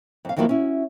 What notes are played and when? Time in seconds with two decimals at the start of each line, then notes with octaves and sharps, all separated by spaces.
0.25 F2 F5
0.36 F2 D#3 E3 F#3 A#3 F4
0.49 C#4 E4 F#4